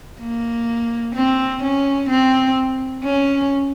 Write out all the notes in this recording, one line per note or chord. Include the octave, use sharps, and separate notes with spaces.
A#3
C4
C#4
C4
C#4